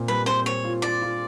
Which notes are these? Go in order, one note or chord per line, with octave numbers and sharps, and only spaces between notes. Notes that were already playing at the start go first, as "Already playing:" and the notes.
Already playing: A#2 C4
G3 B4
C4 C5
C4 C#5
F4
F4 D5
F4